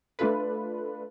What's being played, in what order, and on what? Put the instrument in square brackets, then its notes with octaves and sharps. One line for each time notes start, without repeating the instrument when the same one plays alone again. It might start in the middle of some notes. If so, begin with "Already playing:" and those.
[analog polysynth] A3 D4 F4 A4 B4